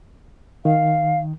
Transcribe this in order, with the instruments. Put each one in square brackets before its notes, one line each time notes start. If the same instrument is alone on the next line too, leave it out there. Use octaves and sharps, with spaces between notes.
[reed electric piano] D#3 [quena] F5